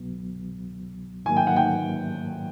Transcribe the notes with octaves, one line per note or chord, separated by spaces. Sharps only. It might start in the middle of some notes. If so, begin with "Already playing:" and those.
Already playing: C2 B2 F#3 B3
G#2 D#3 F#3 A#3 G#5
G5
F#5
G5